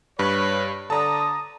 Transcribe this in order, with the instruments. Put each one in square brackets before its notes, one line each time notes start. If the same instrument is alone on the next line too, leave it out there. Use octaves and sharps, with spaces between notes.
[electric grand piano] G2 [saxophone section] B4 [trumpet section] C#5
[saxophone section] D3 [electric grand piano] A5 A#5 [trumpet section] D#6